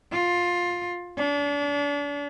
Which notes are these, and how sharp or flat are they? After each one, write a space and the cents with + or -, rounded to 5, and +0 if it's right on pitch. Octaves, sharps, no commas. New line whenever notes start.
F4 +15
D4 -35